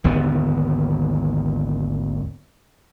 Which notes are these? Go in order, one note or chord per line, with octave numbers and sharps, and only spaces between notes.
G#1 D#2 D3 B3